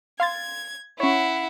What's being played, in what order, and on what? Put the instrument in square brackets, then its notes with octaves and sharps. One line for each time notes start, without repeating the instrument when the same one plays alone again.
[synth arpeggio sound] F5 C6 A6 [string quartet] G#6
[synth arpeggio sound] C#4 C#5 [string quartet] E4 F#5